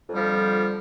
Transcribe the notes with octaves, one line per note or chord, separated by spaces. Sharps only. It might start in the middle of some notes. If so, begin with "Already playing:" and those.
F2 D3 F3 G3